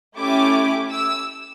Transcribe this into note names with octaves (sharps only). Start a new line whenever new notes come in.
A3 C#4 E4 G4 D6
E6